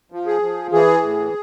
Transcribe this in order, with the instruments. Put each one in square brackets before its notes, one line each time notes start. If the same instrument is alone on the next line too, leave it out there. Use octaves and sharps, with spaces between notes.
[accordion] F3
G#4
F3
E3 G#4
A2